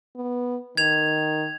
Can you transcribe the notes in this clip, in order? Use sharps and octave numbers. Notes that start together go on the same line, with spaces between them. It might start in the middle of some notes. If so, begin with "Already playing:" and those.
B3
D#3 G#6 F7